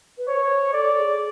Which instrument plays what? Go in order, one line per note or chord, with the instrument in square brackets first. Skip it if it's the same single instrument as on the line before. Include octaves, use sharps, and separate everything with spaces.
[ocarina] B4
[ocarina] C5 [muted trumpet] C#5
[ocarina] A4 [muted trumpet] D5
[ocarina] A4
G#4